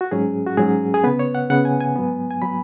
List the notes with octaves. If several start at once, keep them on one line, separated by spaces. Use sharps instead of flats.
F#4
G#2 F#3 C#4 G#4
F#4
G#2 F#3 C#4 G#4
G#4
C#3 B3 B4
C#5
F#5
C#3 B3 F#5
G#5
G#5
G#2 F#3 B3
G#5
F#3 B3 B5